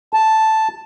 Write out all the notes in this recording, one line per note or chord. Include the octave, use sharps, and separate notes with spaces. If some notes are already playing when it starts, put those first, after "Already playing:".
A5